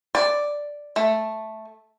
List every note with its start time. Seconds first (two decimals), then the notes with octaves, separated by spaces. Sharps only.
0.15 D5
0.96 A3